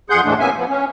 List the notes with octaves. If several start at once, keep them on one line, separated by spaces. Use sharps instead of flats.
F2 G#4 F#5 C6 G6
D#2 A2 E3 G#3 A3 D4
C3 A#3 B3 C#4 E5 G#5
F3 B3
C#4